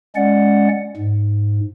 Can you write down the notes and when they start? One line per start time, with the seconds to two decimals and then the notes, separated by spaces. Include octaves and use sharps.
0.16 G#3 C#4 D5 F#5
0.97 G#2